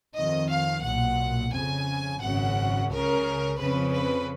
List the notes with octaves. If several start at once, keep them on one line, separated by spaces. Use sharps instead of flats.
F2 D#3 D#5
F5
B1 A#2 F#5
F2 C#3 G#5
G#1 F#2 C#3 F#5
C#2 C#3 A#4
F2 C#3 B4
B4